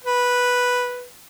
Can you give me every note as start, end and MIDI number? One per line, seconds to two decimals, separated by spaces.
0.04 1.06 71